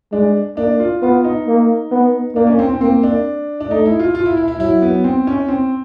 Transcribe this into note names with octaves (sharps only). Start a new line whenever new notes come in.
G#3 D4
A#3 D4
F4
B3 F4
D#4
A#3
B3
A#3 D4
C#4
C4
C4
A#3 C4
D4
D4
A3 D#4
E4
F4
F4
E4
E4
E4
F#3 E4
B3
C4
C#4
C4